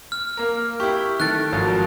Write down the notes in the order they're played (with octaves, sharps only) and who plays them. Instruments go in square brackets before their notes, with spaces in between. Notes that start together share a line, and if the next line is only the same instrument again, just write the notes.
[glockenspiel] F6
[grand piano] A#3 A#4
[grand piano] E4 G4 [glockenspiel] C#6
[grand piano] D#3 A3 [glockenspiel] F#6 A6
[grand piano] G#1 F3 F#3